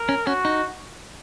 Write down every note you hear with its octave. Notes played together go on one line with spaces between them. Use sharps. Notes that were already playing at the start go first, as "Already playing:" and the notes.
Already playing: A#4
C#4
C#4 F#4
D#4